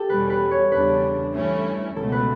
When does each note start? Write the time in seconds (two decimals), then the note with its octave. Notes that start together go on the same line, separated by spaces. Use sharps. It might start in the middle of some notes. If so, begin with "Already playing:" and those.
Already playing: G4 A4
0.09 E2 B2 G3 C#4 B4
0.30 B4
0.51 C#5
0.72 E2 C#3 G3 D4 B4
1.34 G2 E3 A3 C#4 E4
1.96 C#2 B2 A3 A4
2.12 B4